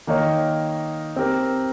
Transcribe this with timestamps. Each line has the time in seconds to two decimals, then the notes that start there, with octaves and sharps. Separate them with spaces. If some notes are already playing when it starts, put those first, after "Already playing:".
0.07 D#3 A#3 D#4 A#4 C#5
1.16 C4 G4 A#4